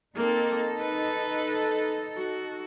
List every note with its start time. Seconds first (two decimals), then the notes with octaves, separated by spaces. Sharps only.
0.16 A#3 C4 D#4 A4
0.78 B4
2.17 F#4